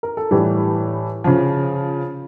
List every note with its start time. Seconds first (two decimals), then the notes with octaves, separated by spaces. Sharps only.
0.03 A#4
0.17 A4
0.31 A2 E3 G3 G4
1.24 C#3 F3